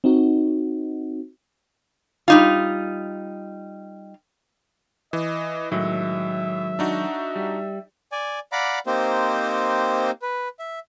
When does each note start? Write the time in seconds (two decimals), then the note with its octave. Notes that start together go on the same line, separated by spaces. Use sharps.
0.04 C4 D#4 F#4
2.28 G3 D#4 F4
5.13 E3 D#5
5.72 A2 D#3 F#3 G#3 E5
6.79 D4 D#4 F#4
7.35 G3
8.12 D5 G#5
8.52 D5 F5 F#5 A#5 B5 D6
8.87 A#3 C4 D#4 G4 C5
10.22 B4
10.59 E5